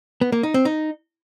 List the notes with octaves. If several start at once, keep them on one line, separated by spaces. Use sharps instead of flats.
B3
A#3
D#4
C4
D#4